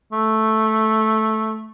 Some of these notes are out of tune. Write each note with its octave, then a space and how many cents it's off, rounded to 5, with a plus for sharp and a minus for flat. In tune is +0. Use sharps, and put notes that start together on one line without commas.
A3 -5